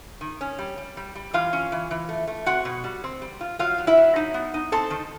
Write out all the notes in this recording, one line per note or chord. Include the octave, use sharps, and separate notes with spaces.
D#3
C#4
G3
G3
G3
G3
E3 F4 F5
C#4
E3
E3
A3
A3
C4 F#4 F#5
B2
G3
C4
G3
F4
F#3 F4 F5
F#3
E4 E5
F#3
D#4
B3
D#4
C4 A4 A5
D#3